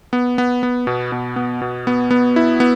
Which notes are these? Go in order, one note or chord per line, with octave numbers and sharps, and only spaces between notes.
B3
B3
B3
B2
B2
B3
B2
B3
B3
E4
B3